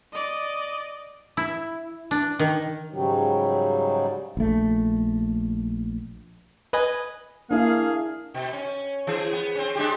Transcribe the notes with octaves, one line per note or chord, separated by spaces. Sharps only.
D5 D#5
E4
D4
D#3
G#2 C#3 F#3 G3
A#1 A3
B4 D#5 G#5
A#3 D4 E4 G#4 F5
B2
C#4
E3 G#4
B3
C4 C#4
G#3 D4 G4